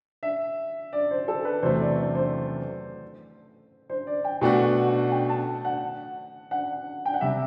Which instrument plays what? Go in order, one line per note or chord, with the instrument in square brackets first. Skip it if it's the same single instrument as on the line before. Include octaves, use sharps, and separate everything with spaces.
[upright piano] E5
D5
C5
A4
B4
[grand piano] E2 C3 F#3 A3 [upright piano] C5
[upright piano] D5
D5
C5
C5
D5
G5
[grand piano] B2 A3 D4 F#4 [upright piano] G5
[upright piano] F#5
F#5
G5
A5
F#5
F#5
G5
F#5
[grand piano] C3 G3 [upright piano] E5